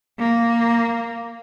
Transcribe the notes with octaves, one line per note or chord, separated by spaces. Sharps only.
A#3